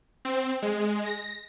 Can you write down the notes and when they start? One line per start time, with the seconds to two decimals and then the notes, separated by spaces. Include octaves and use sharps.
0.25 C4
0.62 G#3
1.06 A#6